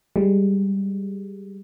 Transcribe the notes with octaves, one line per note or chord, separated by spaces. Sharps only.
G3 G#3